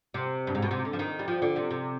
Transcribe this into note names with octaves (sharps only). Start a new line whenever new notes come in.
C3
G2
G#2
B2
C3
D3
F3
D#3
G3
F3
D3
C3
C3